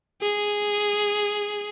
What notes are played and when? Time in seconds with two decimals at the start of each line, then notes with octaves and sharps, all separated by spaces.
0.21 G#4